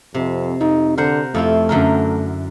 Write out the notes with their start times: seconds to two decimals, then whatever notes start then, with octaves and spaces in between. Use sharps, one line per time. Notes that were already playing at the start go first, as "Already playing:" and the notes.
0.14 F2 C3
0.61 F2 D#4
0.97 D3 A#4 C5 F#5
1.35 F2 A3 E4 F4
1.69 F#2 D3 A#4